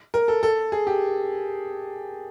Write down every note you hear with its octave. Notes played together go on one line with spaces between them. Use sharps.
A#4
A4
A4
G#4
G4